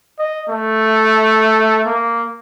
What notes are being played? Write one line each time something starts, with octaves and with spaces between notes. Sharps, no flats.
D#5
A3
A#3